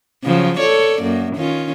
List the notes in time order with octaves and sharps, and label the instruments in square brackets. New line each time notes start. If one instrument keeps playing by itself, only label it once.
[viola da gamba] C#3 F3 F#3
A4 C#5 D5
F#2 A#3
D#3 C#4 F4